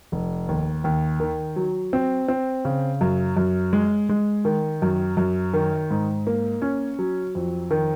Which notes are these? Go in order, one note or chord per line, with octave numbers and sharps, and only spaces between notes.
F1
D#2
D#2
D#3
F#3
C4
C4
C#3
F#2
F#2
G#3
G#3
D#3
F#2
F#2
D#3
G#2
A#3
C#4
F#3
F2
D#3